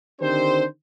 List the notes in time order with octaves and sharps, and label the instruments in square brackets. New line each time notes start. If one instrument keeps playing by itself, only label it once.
[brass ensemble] D3 D#3 C4 D4 G4 C5